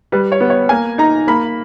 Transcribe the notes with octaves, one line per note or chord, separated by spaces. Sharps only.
G3 B4
C#5
B3
C#5
A#3 G#5
D#4 A#5
A#3 B5